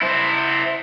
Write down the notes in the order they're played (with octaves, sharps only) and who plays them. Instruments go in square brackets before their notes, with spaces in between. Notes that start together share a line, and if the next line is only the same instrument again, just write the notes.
[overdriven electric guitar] E4 C5